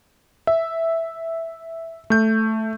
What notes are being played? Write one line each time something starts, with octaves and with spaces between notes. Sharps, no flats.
E5
A3 G6